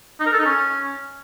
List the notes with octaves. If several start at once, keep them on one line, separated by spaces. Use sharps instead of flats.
D#4
A#4
A4
D#4
C#4